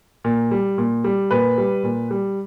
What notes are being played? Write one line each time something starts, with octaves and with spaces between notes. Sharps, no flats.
A#2
G3
A#2
G3
A#2 B4
G3
A#2
G3